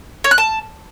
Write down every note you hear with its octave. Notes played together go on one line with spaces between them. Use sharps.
C#5
F#6
A5